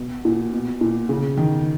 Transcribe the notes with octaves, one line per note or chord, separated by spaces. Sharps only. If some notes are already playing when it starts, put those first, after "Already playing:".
Already playing: B2
A#2
B2
A#2
C#3
D#3